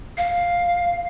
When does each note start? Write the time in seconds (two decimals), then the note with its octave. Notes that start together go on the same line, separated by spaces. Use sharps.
0.18 F5